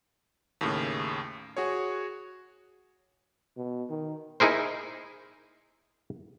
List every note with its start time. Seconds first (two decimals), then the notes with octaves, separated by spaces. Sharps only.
0.61 D#2 A2 C#3
1.57 F#4 G#4 C#5
3.57 B2
3.90 D#3
4.40 D#4 E4 G#4 A#4 C5